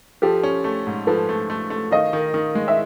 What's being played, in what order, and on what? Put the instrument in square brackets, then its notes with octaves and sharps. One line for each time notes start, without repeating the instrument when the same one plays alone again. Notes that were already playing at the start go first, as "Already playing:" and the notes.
[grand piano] F3 [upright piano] G4 A4
[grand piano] C#4
A3
G#2
[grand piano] F3 [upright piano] A4 B4
[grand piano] A3
A3
A3
[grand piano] D#3 [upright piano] D#5 F5
[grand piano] D#3
D#3
G#3
[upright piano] E5